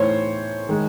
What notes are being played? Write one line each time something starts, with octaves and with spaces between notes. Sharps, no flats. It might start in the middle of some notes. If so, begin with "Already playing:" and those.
Already playing: A2 E3 A3 D#4 C5 C#5
D#3 G#3